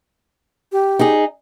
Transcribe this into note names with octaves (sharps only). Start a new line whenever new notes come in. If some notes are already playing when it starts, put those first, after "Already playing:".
G4
D#4 G#4